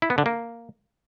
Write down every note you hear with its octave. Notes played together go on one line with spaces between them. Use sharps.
E4
B3
D3
A#3